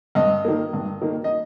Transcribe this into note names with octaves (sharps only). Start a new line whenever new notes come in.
G2 D#5
D#3 A#3
G2
D#3 A#3
D#5